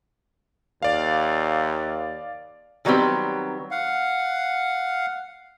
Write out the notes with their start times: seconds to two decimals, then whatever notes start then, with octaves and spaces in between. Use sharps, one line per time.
0.82 D#2 D5 F5
2.85 D#3 F#3 G3 B3 C4
3.71 F5 F#5